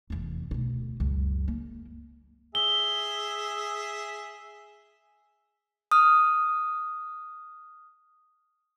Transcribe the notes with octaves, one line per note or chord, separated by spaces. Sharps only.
F1 E2
D2 B2
C#2 F#2
A#3
G#4 E5 G7
D#6 F6